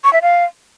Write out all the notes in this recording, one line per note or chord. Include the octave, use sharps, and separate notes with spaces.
C#6
E5
F5